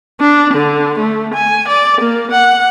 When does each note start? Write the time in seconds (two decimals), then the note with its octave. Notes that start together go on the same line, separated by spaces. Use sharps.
0.21 D4
0.54 D3
0.99 A3
1.34 G#5
1.68 D5
2.01 A#3
2.31 F#5